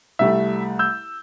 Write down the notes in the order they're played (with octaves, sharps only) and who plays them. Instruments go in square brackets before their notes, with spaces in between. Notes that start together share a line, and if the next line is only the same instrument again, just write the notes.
[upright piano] C2 G3 A3 [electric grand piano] E5
[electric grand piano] E6 G6